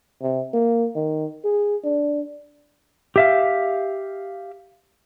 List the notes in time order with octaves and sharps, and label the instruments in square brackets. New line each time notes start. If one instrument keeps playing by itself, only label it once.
[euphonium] C3
A#3
D#3
G#4
D4
[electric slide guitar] G4 E5 F5